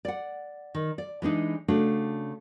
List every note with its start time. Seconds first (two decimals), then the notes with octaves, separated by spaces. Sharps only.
0.05 D5 F#5
0.75 D#3
0.98 D5
1.22 E3 G#3 D4 D#4
1.68 C#3 A3 D4 F#4